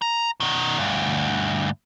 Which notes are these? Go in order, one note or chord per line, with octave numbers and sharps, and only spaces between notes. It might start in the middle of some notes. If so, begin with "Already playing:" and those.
A#5
B2 D#3
D2 G2